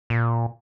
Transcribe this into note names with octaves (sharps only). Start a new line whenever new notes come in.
A#2